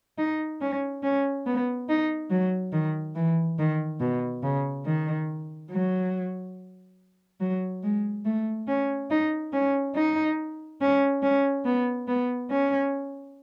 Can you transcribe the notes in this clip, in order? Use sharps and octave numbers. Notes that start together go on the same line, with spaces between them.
D#4
C#4
C#4
B3
D#4
F#3
D#3
E3
D#3
B2
C#3
D#3
F#3
F#3
G#3
A3
C#4
D#4
C#4
D#4
C#4
C#4
B3
B3
C#4